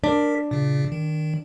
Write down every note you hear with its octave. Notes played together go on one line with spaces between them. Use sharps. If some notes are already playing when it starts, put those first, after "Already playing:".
D4 A#4 B6
A#2 C#3
D#3